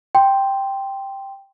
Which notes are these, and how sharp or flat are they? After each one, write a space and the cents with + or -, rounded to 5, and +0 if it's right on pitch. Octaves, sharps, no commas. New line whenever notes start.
G5 +0 C6 +0